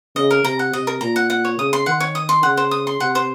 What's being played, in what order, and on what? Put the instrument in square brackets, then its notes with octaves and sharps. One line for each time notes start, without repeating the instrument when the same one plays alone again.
[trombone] C#3 [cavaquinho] D#5
[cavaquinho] A#4
[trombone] C3 [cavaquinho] A#5
[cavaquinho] F#5
[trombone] C3 [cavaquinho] D#5
[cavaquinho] A#4
[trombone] A#2 [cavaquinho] A#5
[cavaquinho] F#5
F#5
C#5
[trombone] C#3 [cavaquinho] D#6
[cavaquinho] C6
[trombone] D#3 [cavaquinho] F#5
[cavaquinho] C#5
D#6
C6
[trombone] C#3 [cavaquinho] F#5
[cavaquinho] C5
D#6
C6
[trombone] C3 [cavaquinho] F#5
[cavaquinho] C5